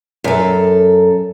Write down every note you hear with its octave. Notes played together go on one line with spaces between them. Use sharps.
F#2 A4